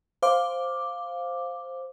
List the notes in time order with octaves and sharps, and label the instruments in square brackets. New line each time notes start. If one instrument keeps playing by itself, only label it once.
[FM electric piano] C5 F5 D6